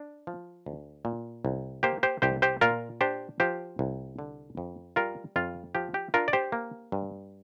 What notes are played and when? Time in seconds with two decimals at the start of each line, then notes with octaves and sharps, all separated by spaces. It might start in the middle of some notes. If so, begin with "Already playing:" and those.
Already playing: D4
0.27 F3
0.66 D2
1.05 A#2
1.45 C2
1.83 A#3 G4 C5
2.03 G4 C5
2.22 C2 G4 C5
2.42 G4 C5
2.61 A#2 F4 A#4
3.01 D4 G4 C5
3.40 F3 G4 C5
3.79 C2
4.19 D3
4.57 F2
4.96 G3 F4 A#4
5.36 F2 F4
5.75 F3 G4
5.94 G4
6.14 D4 F4 A#4
6.28 D5
6.33 G4 C5
6.52 A#3
6.92 G2